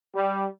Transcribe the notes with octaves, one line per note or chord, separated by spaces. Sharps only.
G3